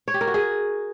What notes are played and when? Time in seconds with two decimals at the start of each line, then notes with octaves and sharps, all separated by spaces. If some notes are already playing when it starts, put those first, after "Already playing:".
0.08 C#5
0.14 G4
0.21 A#4
0.27 F#4
0.34 G#4